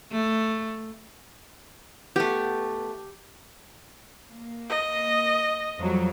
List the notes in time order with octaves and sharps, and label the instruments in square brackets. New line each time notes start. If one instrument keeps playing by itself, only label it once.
[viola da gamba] A3
[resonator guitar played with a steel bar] A3 B3 [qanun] G4
[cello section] A#3
[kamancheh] D#5
[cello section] F2 F#3 G3